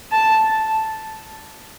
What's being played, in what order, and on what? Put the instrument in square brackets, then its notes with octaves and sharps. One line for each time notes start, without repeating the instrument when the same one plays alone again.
[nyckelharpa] A5